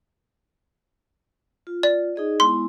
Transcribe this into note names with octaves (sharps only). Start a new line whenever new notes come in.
F4
D5
D#4 G#4 D#5
G#3 B3 E4 C6